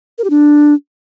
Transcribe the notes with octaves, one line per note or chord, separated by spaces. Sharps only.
A#4
G4
D4